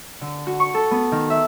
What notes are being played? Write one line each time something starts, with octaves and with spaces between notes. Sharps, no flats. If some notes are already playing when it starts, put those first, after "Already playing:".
D3
F#4
C#6
A4
B3
D#3
E5